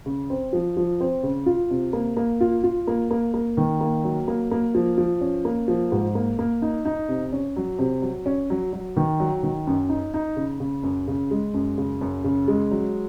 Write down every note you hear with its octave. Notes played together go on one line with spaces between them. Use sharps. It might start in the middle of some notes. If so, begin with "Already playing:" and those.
C#3
C4
F3
F3
C4
C#3
F4
C3
A#3
A#3
F4
F4
A#3
A#3
A#3
D#3
A#3
F#3
A#3
A#3
F3
F3
C#4
A#3
F3
G#2
A#3
A#3
D#4
D#4
C3
C#4
F#3
C3
F#3
C#4
F#3
F#3
D#3
F#3
D#3
F#2
D#4
D#4
C#3
C#3
F#2
C#3
G#3
F#2
C#3
F#2
C#3
G#3
F#3